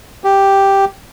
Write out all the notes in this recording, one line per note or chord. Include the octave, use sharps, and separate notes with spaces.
G4